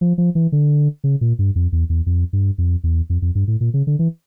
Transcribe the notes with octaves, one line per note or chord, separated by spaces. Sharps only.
F3
F3
E3
D3
C#3
A#2
G2
F2
E2
E2
F2
G2
F2
E2
F2
F2
G2
A2
A#2
C#3
D3
E3